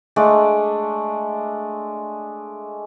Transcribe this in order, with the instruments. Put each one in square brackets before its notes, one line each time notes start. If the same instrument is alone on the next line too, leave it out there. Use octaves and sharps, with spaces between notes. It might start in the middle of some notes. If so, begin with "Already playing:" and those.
[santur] G#3 A3 D4 D5